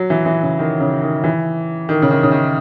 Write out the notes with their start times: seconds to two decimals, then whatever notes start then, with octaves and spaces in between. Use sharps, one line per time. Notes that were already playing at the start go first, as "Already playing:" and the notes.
Already playing: F#3
0.10 E3
0.26 E3
0.43 C#3
0.59 D#3
0.80 C#3
1.02 D#3
1.24 E3
1.89 D#3
2.02 C#3
2.11 D#3
2.23 C#3
2.32 D#3